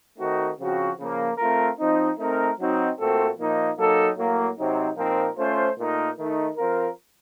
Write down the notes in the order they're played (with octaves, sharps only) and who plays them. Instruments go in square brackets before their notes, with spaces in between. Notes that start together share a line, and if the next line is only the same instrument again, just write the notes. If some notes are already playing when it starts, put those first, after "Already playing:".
[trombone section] D#3 A3 C4 D#4 F#4
C#3 F3 C4 F#4
C#3 F3 A#3
A3 C4 F4 A#4
F3 C4 D#4
A3 C4 D#4 A#4
F#3 C4 D#4 F#4
A#2 A3 C4 F#4 A4
A#2 F3 A#3 D#4
F#3 A#3 D#4 A4
A2 F#3 A#3
C3 F#3 C4 D#4
A#2 F3 C4 D#4 A#4
A3 C#4 F4 C5
A#2 A3 D#4 A#4
D#3 A3 D#4
F3 C4 F4 A#4